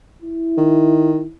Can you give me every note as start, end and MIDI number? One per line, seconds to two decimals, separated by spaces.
0.22 1.35 64
0.57 1.23 51